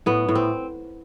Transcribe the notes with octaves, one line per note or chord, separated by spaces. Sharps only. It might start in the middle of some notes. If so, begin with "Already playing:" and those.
A2 B3
A2
C4